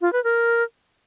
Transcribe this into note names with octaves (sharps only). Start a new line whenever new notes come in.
F4
B4
A#4